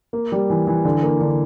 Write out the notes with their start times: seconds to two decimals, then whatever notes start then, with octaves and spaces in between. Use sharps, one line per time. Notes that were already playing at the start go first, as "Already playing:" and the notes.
0.13 A#3
0.32 G3
0.50 E3
0.67 E3
0.85 D3
1.03 A#3
1.21 D3